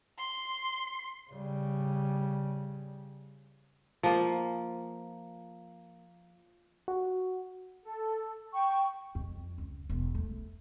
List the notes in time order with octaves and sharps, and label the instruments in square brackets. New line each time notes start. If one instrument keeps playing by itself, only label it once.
[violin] C6
[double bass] C#3 G3
[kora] F3 A#3
[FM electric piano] F#4
[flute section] A4
G5 C#6
[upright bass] F2
C#2
E1
A3